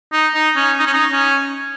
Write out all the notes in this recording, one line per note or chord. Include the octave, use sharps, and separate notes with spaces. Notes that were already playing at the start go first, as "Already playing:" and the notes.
D#4
D#4
C#4
D#4
C#4
D#4
C#4